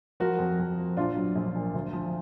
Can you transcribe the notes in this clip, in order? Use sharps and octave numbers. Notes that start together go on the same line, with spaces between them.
F3 F#4 A#4
F2
F2
F3
A#1 D4 F4
F#3
A#1
A#2
D2
F3